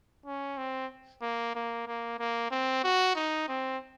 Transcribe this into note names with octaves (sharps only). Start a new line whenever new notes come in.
C#4
C4
A#3
A#3
A#3
A#3
C4
F#4
D#4
C4